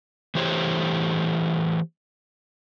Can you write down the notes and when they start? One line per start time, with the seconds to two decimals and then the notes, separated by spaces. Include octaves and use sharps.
0.35 E3 A3 G4 C5 C#5